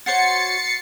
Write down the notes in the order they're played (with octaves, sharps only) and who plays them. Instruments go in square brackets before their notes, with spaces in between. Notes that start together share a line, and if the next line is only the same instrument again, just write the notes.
[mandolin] F#4 C5 C#5 [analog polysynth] A6 C7 C#7